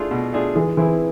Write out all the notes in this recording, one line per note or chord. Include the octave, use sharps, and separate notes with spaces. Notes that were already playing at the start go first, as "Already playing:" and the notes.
Already playing: A3 D4 F4 G#4
B2
A3 D4 F4 G#4
E3 G#3
E3 C4 E4 G#4